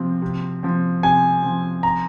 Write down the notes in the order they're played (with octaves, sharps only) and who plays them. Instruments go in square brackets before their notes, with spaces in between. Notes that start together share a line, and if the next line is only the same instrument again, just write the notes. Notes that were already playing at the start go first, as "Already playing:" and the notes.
Already playing: [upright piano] C3 F3 C4
C3
F3 C4
[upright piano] C3 [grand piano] G#5
[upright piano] F3 C4
[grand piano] A#5